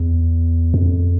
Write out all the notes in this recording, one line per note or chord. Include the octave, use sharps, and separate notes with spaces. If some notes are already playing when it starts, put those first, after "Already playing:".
Already playing: E2
F2